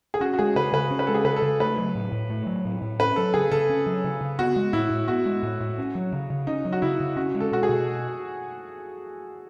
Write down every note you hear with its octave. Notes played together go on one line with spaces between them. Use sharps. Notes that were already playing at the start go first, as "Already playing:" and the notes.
G#4
C#4 F#4
F#4
G#3 G#4
C#3 B4
C#3 B4
C#4
B4
G#3 A4
G#4
C#3 B4
A4
C#3
A3 B4
F#3
A2
A2
A3
F#3
A2
A2
C#4 B4
F#3 A4
C#3 G#4
C#3 A4
C#4
F#3
C#3
C#3
B3 F#4
G#3
A2 E4
A2
B3 F#4
G#3
A2
A2
C#4
F#3
C#3
C#3
C#4 D#4
F#3
F#4
C#3 E4
C#3
C#4 F#4
G#3
A4
B2 F#4
G#4
B2